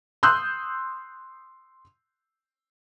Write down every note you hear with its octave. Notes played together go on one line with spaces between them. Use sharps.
C6 D#6 E6 F#6 G6